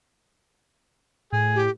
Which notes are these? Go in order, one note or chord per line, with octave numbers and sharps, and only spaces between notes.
A2 G#4
G4